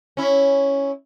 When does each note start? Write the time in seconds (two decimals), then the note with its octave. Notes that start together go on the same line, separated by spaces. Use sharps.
0.17 C#4 E4